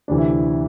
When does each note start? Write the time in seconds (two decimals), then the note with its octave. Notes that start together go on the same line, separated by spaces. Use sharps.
0.08 D2 C3 E3 D4
0.18 E4